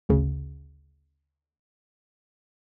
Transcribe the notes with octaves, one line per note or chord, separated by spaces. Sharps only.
G#1 D2 C#3